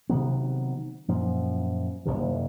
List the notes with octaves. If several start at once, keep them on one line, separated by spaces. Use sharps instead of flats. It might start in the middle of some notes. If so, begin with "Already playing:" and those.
C3 D#3 F#3 B3
F#2 A#2 F3
F#1 B1 C3 D#3